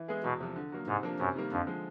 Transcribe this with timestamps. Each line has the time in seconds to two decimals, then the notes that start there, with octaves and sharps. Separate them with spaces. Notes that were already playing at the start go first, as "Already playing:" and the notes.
Already playing: E3
0.08 G#3 B3 E4 G#4
0.24 E2 B2
0.40 C3 F3
0.56 D3
0.72 F#3 A#3
0.87 G#2 C3
1.03 F3 A#3 D4
1.19 F#2 C3
1.35 D#3 G3 A#3
1.51 F2 D3
1.67 F3 G#3